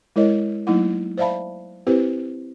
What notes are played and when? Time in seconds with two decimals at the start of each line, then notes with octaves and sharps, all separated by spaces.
0.16 G#3 E4 A#4 C#5 D#5
0.67 F#3 A3 A#3 D#4 E4 F#5
1.18 C5 D5 E5 F5 A5 B5
1.87 C4 E4 G4 B4 C5